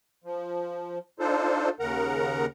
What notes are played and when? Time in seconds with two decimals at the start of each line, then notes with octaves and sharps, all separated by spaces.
0.24 F3
1.20 D4 D#4 F4 A4 C5
1.80 D#2 C#3 A#4 F#5 A#5